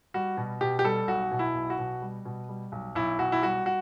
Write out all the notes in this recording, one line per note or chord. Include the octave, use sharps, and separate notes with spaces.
G3 F#4
B2
B2 G4
G4
G3 A4
B1 F#4
B2
E4
B1
F#4
B2
G3
B2
G3
B1
B1 E4
B1 F#4
E4
G3 F#4
F#4